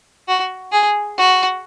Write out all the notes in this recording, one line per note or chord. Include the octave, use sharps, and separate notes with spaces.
F#4
G#4
F#4